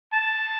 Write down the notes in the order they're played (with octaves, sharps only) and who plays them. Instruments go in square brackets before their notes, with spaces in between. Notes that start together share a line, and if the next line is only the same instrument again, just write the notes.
[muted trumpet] A5